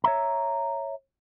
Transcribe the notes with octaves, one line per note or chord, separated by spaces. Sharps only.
C#5 E5 A#5